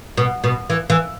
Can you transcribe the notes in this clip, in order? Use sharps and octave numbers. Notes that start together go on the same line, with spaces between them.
B2
B2
E3
E3